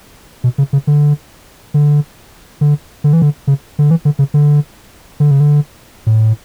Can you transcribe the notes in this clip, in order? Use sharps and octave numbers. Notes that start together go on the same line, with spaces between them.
B2
C#3
C#3
D3
D3
D3
D3
E3
D3
C#3
D3
E3
D3
C#3
D3
D3
C#3
D3
A2